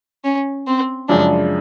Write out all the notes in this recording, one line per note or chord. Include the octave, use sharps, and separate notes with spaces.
C#4
C4
F#2 C#3 F3 G#3 D4